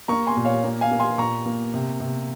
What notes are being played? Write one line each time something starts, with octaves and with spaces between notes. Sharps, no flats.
A#3 A#5 C#6
G#5 C6
A#2
C#5 F5
A#3
F5 G#5
A#3
G#5 C6
A#2 A#5 C#6
A#3
C3
C3